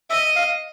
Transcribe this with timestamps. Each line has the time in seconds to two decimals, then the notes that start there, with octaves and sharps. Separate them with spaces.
0.10 D#5 E5
0.36 F5